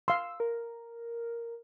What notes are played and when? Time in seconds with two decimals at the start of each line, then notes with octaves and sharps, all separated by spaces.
0.08 F5 C6 E6
0.40 A#4